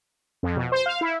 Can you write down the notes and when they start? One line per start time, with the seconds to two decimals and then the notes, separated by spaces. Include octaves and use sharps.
0.43 F2
0.56 B2
0.72 C5
0.86 F5
1.01 E4